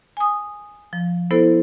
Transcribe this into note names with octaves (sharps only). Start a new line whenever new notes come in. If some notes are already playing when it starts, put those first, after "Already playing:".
G#5 D#6
F3
B3 E4 A4 C5